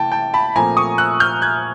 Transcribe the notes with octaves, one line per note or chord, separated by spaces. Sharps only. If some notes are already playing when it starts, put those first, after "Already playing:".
Already playing: C3 E3 A3 G5 A5
G5 A5
A5 B5
A#2 F3 A3 C4 G#5 A#5
C#6 D#6
E6 F#6
F6 G6
F#6 G#6